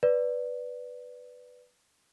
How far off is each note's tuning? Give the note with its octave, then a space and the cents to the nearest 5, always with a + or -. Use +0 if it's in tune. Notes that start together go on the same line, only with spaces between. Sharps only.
B4 +0 D5 +0